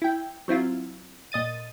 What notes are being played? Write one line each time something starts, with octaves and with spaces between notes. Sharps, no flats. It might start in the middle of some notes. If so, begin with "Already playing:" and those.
E4 G5
F#3 C4 E4 F4
A#2 D#5 A6 D#7